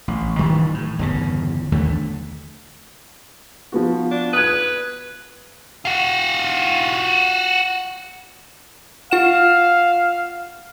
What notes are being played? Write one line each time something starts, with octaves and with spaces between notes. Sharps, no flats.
A1
D#3 E3 G3
A2
G1 E2 C#3
D#2 D3 A3
F3 B3 F#4
D4
B4 D#6 F#6 G#6
F4 F#4
F4 F5 F#5 E7